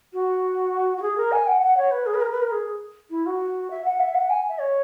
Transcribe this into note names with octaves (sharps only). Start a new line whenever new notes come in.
F#4
F#4
G#4
A#4
G#5
F#5
F#5
C#5
B4
G#4
B4
A#4
B4
A#4
G#4
E4
F#4
E5
F#5
E5
F#5
G#5
E5
C#5